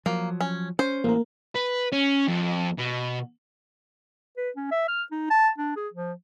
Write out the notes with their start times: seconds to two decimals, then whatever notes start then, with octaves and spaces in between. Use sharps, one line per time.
0.06 F3 F#3 A#3
0.41 C#4
0.79 C#4 C5
1.04 A1 A#3 A#4
1.56 B4
1.92 C#4
2.28 F2
2.79 B2
4.37 B4
4.56 C#4
4.71 E5
4.88 F6
5.11 D#4
5.30 A5
5.58 D4
5.76 G#4
5.93 F3